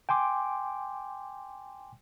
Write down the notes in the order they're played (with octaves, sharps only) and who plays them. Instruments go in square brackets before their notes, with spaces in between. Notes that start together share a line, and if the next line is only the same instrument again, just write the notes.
[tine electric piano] G5 G#5 C6 D6